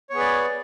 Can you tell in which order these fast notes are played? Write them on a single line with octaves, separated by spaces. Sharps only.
C#5 B3 G#4 B4 D5